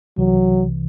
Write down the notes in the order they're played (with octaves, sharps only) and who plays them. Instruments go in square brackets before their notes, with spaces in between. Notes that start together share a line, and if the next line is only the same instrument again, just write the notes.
[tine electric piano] C2 C3 E3 [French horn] F#3